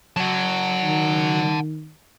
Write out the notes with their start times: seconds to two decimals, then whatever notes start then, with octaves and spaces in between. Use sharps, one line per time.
0.17 F#3 F#5 A5
0.84 D#3